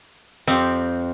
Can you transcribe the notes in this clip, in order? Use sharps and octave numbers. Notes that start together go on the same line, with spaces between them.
F2 C4 G4